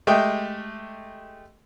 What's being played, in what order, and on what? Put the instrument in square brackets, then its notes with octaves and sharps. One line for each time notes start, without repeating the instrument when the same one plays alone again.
[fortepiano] G#3 A3 G4 D#5 G5